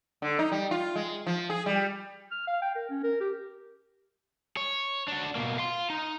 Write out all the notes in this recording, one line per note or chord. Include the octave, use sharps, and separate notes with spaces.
D3
D#4
G3
F4
G#3
F3
G#4
G3
F6
F5
G5
A#4
C#4
A#4
G4
C#5
D4 F#4
B2 A#3
F5 C6
D#4